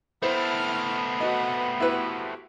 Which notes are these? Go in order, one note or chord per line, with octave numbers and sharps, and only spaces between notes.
A3 B3 C4 E4 C5 F6
F#4 B4 D#5 F#5
E4 F#4 G4 B4